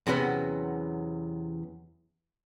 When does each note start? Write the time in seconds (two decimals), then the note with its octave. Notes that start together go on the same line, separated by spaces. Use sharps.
0.07 E2 C3 F#3 B3 C#4